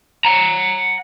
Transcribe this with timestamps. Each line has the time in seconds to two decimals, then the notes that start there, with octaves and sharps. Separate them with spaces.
0.25 F#5 A#5